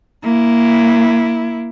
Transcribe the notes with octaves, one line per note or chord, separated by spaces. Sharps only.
A#3 E4